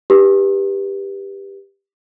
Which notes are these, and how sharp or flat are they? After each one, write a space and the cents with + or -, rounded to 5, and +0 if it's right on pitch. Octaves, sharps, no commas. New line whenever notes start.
D#4 +0 G4 +10 B4 -20